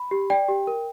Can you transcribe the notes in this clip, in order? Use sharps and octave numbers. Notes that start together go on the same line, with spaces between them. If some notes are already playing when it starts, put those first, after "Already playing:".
Already playing: B5
G4
D5 G5
G4
A#4